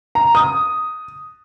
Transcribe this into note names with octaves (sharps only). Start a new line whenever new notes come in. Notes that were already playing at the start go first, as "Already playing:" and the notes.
A#5
D#6